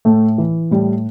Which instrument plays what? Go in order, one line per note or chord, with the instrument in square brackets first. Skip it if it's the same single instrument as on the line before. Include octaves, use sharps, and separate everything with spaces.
[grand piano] A2 A3
E3
A2 G3